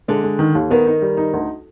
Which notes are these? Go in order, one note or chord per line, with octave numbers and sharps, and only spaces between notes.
D3 G#3
G#3
D#3
D#2
D#3 B3
D#4
G3
D#4
D2